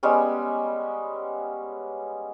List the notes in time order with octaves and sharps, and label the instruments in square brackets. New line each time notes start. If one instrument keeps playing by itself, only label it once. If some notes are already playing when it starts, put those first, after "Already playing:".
[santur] G3 G#3 B3 C#4